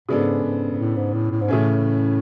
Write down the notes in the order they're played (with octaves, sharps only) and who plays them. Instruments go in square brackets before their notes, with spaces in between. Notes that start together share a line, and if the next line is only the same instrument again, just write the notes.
[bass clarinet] G#2 [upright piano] C#3 G#3 B3 D4 A4
[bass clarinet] G#2
G#2
A2
G#2
A2
A2
G#2
[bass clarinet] A2 [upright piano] C#3 E3 A3 C#4